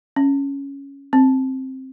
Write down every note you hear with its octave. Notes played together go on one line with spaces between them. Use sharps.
C#4
C4